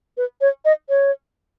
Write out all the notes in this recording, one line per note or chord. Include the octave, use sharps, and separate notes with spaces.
B4
C#5
D#5
C#5